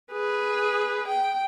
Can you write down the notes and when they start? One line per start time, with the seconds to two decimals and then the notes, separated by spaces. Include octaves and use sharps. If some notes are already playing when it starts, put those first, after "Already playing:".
0.12 G#4 B4
1.08 G5